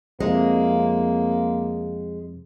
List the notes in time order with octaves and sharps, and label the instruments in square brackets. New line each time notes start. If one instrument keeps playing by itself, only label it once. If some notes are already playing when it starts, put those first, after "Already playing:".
[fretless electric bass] F2 C3 [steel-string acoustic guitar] G#3 [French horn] A#3